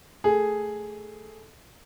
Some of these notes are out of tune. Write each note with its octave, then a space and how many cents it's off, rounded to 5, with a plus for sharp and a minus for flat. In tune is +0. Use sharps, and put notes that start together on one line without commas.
A3 +0 G#4 +0